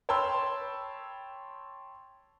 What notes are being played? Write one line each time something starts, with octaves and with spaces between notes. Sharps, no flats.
C#5 G5 A5 B5 C6 E6